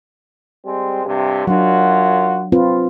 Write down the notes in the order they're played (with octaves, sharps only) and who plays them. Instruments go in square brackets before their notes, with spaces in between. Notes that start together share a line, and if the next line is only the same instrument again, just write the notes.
[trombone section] G3 G#3 C4
G2 C3
[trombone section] F#2 F4 F#4 [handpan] F#3 D4
[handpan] C4 F4 B4